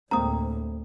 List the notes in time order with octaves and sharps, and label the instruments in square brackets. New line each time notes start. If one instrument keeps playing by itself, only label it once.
[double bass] D2 A2 [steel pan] G#3 A#3 C4 [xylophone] A#5 D#6